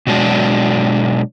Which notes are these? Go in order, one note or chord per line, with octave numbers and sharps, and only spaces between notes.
B2 F#3 G#3 D4